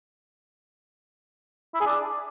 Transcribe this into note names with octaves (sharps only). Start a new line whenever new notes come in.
E4
G#4
D4